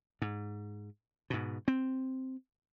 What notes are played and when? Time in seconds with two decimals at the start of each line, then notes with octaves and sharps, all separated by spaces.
0.22 G#2
1.30 G#2 B2
1.68 C4